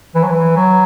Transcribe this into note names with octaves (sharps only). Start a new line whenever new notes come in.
E3
F#3
E3
F#3